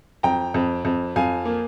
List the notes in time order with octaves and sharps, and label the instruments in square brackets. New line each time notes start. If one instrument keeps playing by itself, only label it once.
[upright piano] F2 G5 A#5
F2
F2
F2 F5 G#5
A#3